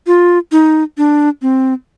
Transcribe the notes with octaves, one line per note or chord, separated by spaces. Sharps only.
F4
D#4
D4
C4